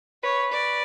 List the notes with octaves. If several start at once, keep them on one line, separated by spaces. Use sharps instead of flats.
B4 C#5
D5